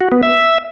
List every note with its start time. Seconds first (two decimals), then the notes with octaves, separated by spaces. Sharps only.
0.01 F#4
0.12 B3
0.23 E5